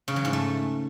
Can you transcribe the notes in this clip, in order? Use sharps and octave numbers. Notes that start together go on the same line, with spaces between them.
C#3
F#3
G#2
A3